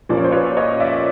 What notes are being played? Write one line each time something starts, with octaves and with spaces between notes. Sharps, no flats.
A#2 F3 A#3 C#4 D5
C#5
C5
B4 C#5
C#5 D#5
D5 E5